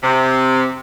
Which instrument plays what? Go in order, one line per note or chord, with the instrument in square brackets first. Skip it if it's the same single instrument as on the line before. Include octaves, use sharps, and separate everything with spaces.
[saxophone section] C3